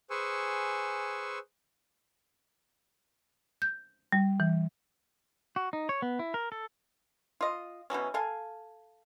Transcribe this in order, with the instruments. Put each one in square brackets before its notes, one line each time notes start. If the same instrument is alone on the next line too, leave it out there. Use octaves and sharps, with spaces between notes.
[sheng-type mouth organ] G#4 B4 C5 G#5 C#6 E6
[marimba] G6
G3
E3
[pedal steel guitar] F#4
D#4
C#5
B3
E4
A#4
A4
[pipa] F4 D#5
B2 E3 F#3 C#4
A4 F5 G#5